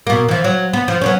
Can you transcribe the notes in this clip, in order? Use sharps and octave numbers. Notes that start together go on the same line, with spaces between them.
B2 A#3
E3 F3
F#3
B3
F3
F#3 B3 C#4